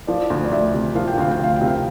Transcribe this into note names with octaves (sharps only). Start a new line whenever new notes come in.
F3 D5
D2
D5
D2 E5
C3
F3 F5
G5
D2 F5
G5
D2 F5
G5
C3
F5